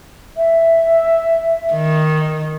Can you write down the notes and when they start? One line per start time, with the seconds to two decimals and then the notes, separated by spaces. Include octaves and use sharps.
0.36 E5
1.74 D#3